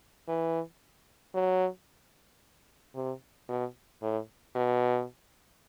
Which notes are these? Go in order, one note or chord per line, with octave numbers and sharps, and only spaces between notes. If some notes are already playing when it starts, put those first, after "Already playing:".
E3
F#3
C3
B2
A2
B2